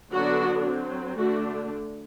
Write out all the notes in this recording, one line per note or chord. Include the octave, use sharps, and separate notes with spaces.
D3 F#3 B3 D4 F#4
F#3 C4
D3 A3 D4 F#4